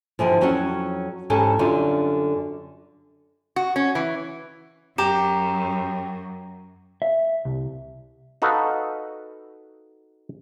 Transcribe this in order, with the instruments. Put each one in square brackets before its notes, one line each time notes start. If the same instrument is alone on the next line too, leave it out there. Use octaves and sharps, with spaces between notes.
[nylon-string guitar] G2 D3 E3 F3
F2 F#3 C#4 F#4 F#5
G#2 E3 C#4 G4 A4 A5
F#2 D3 G3 C#4 F4
[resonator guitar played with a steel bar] F#4
C#4
E3
[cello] F#2 [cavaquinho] G4 [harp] A#5 E7
[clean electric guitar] E5
C2
[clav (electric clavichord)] D#4 F#4 A4 B4 F5